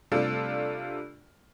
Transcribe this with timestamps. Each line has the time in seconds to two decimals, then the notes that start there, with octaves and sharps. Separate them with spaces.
0.12 C3 G3 A3 D4 F4 A4